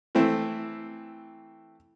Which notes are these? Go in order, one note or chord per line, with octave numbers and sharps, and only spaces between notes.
E3 A3 C4 E4